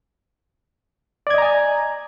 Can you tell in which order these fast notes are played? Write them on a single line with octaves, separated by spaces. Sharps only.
D5 G#6 D#5 A#5 G#5